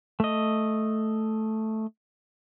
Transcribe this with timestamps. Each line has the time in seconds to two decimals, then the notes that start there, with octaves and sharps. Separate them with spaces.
0.20 A3 D#5